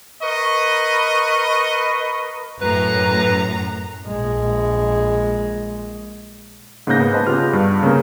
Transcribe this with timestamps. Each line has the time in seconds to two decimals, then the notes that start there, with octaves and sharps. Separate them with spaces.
0.23 A#4 B4 D#5 B5 C#6
2.61 F#2 A2 B4 A#5
4.07 A#1 G#3
6.87 G#2 C#3 A#3 F#6 G6 A#6
7.00 B3
7.13 B4 C5 D#5 A5
7.27 C#3 B3 F4 G4 F6
7.53 G2
7.83 C#3 A#3 B3 A#4